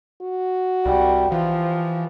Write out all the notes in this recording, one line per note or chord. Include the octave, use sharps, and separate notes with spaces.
F#4
C2 G3
E3 F3